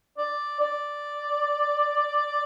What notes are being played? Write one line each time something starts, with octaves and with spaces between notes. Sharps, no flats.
D5
D5